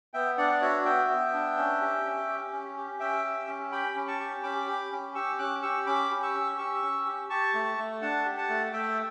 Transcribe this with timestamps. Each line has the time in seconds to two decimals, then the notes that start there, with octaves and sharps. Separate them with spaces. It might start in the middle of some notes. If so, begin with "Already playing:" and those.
0.14 B3 E5 G5
0.38 D4 D5 F#5
0.53 D5
0.61 F#4 C#5 E5
0.85 B3 E5 G5
1.09 B3
1.33 D4
1.57 C#4
1.81 G4
2.05 C#4
2.29 G4
2.52 C#4
2.77 G4
3.00 C#4 E5 G5
3.24 G4
3.48 C#4
3.72 G4 G5 B5
3.96 C#4
4.08 A5 C#6
4.20 G4
4.43 C#4 B5 D6
4.67 G4
4.91 C#4
5.15 G4 C#6 E6
5.39 C#4 D6 F#6
5.62 G4 C#6 E6
5.86 C#4 B5 D6
6.10 G4
6.22 C#6 E6
6.34 C#4
6.58 G4 C#6 E6
6.82 C#4
7.06 G4
7.30 G4 A5 C#6
7.54 A3
7.78 A3
8.02 D4 F#5 A5
8.25 G4
8.37 F#5 A5
8.49 A3
8.73 A3 E5 G5